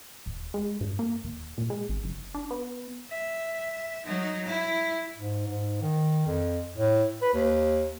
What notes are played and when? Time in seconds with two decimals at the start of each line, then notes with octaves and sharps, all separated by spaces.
0.26 D#1
0.54 G#3
0.81 G2
0.99 A#3
1.23 D#1
1.58 A#2
1.70 G#3
1.89 G#1
2.04 F#1
2.34 D4
2.51 B3
3.09 E5
4.05 F#3 D#4
4.46 E4
5.17 G#2
5.47 G#2
5.81 D#3
6.27 F2
6.76 A2
7.22 B4
7.34 D#2